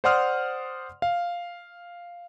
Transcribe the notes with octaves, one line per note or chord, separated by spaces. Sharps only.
C5 D5 F#5 C6 D#6 F6
F5